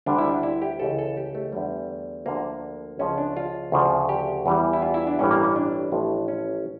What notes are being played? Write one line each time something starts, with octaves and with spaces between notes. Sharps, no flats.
D2 D3 G3 D4
E4
D4
E4
G4
C#2 C#3 E3 A4
A4
G4
A3
E2 D3 G3
D2 D3 F3 A#3
C#2 C#3 F3 C#4
D4
F4
D2 C#3 F3
G4
E2 E3 G3
E4
F4
E4
D4
A1 G2 E3 G3 C#4
A#3
C#4
D4
A1 A2 F3
C#4